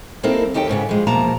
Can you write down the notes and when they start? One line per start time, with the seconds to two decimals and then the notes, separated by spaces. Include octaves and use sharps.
0.23 G3 A#3 C4 D#4 E4 A4
0.54 D#2 D#4 G4 A4 G5
0.69 G#2 C#3 B3
0.89 F3 G#3
1.07 E2 B2 F3 A#3 A5 A#5